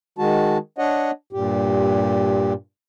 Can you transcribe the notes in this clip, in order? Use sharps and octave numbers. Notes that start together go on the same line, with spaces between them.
D#3 G#3 F#4 A5
D4 C#5 D#5 F#5
G2 A#2 G4